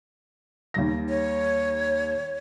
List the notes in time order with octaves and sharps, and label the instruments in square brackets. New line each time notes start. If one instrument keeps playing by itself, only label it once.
[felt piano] D#2 G3 A#6
[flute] C#5